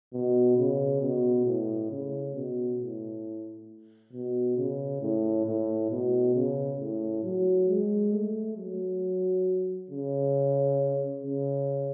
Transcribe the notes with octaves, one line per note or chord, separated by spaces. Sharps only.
B2
C#3
B2
A2
C#3
B2
A2
B2
C#3
A2
A2
B2
C#3
A2
F#3
G#3
A3
F#3
C#3
C#3